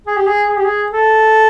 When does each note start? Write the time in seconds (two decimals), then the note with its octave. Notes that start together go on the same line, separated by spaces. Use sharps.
0.07 G#4
0.17 G4
0.27 G#4
0.49 G#4
0.57 G4
0.65 G#4
0.92 A4